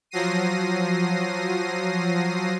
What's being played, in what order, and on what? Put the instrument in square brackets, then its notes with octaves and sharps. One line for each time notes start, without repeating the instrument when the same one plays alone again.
[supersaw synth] F3 F#3 A#6 C7 D#7